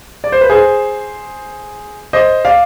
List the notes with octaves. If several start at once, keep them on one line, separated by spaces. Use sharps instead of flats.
D5
C5
B4
G#4 C5
C5 D#5
D5 F5